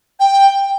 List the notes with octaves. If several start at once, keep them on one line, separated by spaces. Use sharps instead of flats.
G5